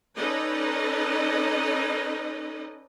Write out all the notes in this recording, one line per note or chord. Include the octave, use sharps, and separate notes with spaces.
C#4 D#4 A4 B4 D5 D#5